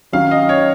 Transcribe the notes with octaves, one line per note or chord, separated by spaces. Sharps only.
D#3 F#3 C#4 F5
D#5
C#5